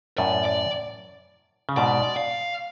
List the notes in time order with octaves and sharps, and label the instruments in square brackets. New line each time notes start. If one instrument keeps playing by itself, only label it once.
[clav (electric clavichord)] F#2 A2 [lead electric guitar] D5
[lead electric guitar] D5
[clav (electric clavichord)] C#3
[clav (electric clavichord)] G#2 B2 [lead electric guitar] D5
[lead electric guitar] F5